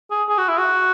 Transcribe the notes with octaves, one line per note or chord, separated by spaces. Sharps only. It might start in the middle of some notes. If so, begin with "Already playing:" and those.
G#4
G#4
F#4
E4
F#4